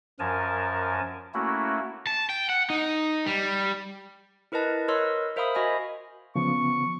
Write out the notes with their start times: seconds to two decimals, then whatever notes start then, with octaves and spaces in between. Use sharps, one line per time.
0.19 F#2 F3 A#4 G#5 A5
1.34 A3 A#3 C#4 E4 F#4
2.07 A5
2.29 G5
2.49 F#5
2.70 D#4
3.26 G3
4.52 E4 A#4 B4 D#5 A5
4.88 A#4 B4 C#5 D#5 C6 E6
5.36 A#4 C5 E5 F5 B5 D#6
5.55 F#4 D#5 G#5 B5
6.36 C#3 F3 B3 C#6